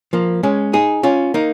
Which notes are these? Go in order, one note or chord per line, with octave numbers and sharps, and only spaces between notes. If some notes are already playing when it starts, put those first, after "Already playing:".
F3 A#3
G#3 C#4
D#4 G#4
C#4 F4
A#3 D#4